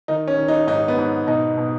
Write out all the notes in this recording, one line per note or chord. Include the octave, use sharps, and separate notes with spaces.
D#3 D#4
C#4
D#3
D#4
G#2 D#4
B3
G#2
B2 D#4
B2